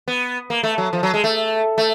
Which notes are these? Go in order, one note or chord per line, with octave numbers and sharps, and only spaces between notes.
B3
A#3
A3
F#3
F3
F#3
G#3
A3
A3